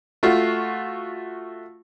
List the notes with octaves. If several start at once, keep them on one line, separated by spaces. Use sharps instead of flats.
A3 F4 F#4